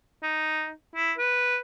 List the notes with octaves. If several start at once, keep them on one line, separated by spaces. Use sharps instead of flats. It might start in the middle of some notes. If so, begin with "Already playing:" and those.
D#4
E4
B4